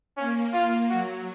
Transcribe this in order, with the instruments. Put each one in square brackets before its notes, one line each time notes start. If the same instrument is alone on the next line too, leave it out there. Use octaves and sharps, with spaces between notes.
[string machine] A#3 [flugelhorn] C#4
[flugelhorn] F4
[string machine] F#3 [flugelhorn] F#4